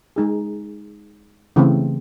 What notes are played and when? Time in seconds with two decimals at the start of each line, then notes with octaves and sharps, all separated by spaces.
0.16 G#3 D#4 G#4
1.56 C#3 E3 A3 C4